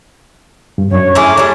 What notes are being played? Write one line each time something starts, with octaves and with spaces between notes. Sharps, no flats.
G2
F#2 D4 C#5
A3 E4 G#4 A#5 C6 D6 F6
G3 D4 C#5 C#6